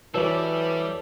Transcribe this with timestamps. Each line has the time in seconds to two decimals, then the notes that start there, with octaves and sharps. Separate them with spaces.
0.14 E3 G3 F#4 A4 B4 C#5 D5